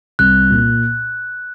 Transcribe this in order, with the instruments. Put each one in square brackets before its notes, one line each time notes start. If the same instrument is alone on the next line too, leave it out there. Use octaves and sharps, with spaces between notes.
[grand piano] C2 [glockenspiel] F#6
[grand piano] A#2